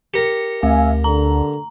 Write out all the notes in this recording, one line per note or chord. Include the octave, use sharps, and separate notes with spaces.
G4 A#4 C#7
D2 A3 E5 F5 G#5
D3 A#5